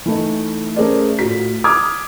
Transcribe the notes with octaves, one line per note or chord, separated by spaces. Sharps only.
E3 A3 D#4
A3 C#4 G#4 A#4 C5 D5
A2 F4 F#4 B6
D6 D#6 F6 G#6